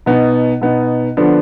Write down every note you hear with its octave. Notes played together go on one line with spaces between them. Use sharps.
B2 B3 D#4
B2 B3 D#4
D3 F3 B3 D4